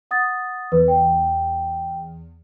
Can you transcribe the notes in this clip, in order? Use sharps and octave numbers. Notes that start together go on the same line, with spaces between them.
F#5 D#6 A6
E2 B4
G5